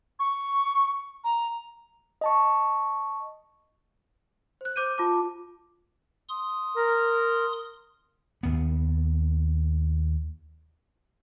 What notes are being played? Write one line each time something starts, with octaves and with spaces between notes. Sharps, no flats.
C#6
A#5
D#5 A5 C#6
C5 F#6
C5 D6 G6 D#7
F4 A5 D6
C6 D#6
A#4
D#2 B3